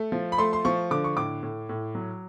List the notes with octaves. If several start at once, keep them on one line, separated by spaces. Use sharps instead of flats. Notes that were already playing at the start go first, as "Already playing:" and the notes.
Already playing: A3
F3
B5
A3 C6
C6
F3 C#6
D3 D6
C#6
A2 D6
A2
A2
F#3